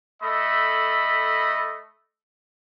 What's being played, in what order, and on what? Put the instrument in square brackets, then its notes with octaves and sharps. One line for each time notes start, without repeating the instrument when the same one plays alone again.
[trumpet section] A3 A4 D#5 B5